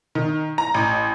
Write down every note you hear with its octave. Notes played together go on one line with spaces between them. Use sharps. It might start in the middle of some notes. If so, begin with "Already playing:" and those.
D#3
A#5
A1